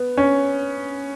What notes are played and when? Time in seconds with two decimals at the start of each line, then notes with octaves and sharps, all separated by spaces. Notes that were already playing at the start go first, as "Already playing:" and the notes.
Already playing: B3
0.18 C#4